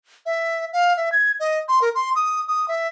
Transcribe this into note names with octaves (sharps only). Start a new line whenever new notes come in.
E5
F5
E5
G#6
D#5
C6
A#4
C6
D#6
D#6
E5